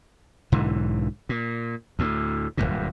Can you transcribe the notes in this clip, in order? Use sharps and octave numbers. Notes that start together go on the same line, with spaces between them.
B1 G#2 D3 E3
A#2
D2 A2
D1 G#1 G2 A#2